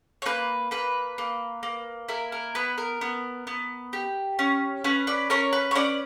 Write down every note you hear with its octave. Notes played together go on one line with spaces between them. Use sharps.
C#5
A#3 B4
A#3 B4
A#3
A#3
E4 A#4
A#4
B3 B4
A#4
B3
B3
G4
C#4
C#4 B4
B4 D5
C#4 A#4 C#5
B4
C#5
C#4 B4 D5